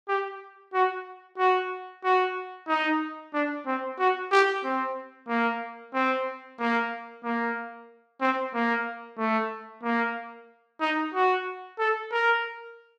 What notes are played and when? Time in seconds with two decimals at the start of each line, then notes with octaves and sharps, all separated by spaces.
0.09 G4
0.73 F#4
1.38 F#4
2.04 F#4
2.68 D#4
3.34 D4
3.66 C4
3.99 F#4
4.32 G4
4.64 C4
5.29 A#3
5.94 C4
6.59 A#3
7.24 A#3
8.21 C4
8.54 A#3
9.18 A3
9.83 A#3
10.81 D#4
11.14 F#4
11.79 A4
12.12 A#4